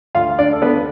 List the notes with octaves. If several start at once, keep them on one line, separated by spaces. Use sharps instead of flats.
D2 F4 F5
D4 D5
A4
D3 B3 B4